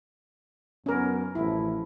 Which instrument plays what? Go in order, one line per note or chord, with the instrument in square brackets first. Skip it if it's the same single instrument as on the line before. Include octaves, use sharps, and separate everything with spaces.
[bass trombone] F#2 [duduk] B3 [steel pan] C#4 A#4
[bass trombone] A1 [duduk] F3 [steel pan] E4